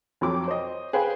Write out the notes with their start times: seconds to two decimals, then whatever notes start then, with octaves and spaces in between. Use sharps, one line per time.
0.21 F2 F#3 D6
0.48 C5 C#5 D#5
0.93 G#4 B4 C5 F5 G5